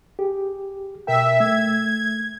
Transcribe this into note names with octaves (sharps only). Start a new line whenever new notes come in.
G4 G#4
B2 A#4 E5 G5
A3 G#6